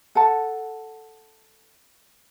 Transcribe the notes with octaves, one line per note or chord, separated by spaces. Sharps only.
A4 F#5 A5